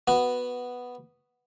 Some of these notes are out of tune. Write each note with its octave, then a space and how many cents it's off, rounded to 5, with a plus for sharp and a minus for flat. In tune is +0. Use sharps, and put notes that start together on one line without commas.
B3 +0 F#4 +0